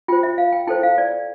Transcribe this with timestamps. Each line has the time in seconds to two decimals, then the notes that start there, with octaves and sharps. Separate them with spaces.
0.08 F4 C5 G5
0.23 E5
0.38 F5
0.52 G5
0.67 E4 A4 C5 G5
0.83 F5
0.98 D5